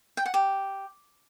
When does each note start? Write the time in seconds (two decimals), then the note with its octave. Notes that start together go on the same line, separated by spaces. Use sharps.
0.17 G5
0.26 F#5
0.34 G4